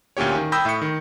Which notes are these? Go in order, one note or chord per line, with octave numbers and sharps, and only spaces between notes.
D2 A#2 C#4 G4 C#5
D#3
G5 B5 D#6 E6 G6 A#6
A2 E5 B5 C#6 C#7
D#3